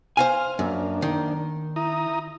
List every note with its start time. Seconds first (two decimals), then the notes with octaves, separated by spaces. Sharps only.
0.17 C5 F5 G#5 F6
0.59 F#2 A#3 D4
1.02 D#3
1.76 E4 A#5 D#6